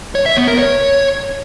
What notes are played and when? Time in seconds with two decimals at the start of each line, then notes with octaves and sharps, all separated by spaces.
0.15 C#5
0.26 E5
0.37 B3
0.48 A#4
0.58 C#5